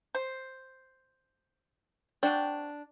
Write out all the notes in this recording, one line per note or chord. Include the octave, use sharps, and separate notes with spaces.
C5
C4 D4 F#4 G5